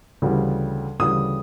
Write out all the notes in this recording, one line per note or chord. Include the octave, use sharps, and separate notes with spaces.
D2 C#3 E3 G3
D2 C#3 E3 G3 D#6